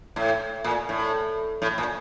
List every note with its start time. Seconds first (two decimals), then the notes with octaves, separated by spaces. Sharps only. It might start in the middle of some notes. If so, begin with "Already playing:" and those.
0.16 A2
0.64 A#2
0.89 A2
1.62 A2
1.78 A#2